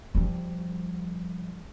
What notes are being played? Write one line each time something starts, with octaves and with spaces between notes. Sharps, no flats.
F3 G3